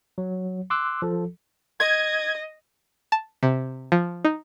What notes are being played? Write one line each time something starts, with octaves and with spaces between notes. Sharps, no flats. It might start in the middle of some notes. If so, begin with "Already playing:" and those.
F#3
C6 D6 E6 F#6
F3 A4
D#5 G#6
A5
C3
F3
D#4